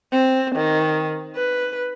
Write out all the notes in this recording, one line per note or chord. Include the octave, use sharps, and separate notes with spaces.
C4
D#3
B4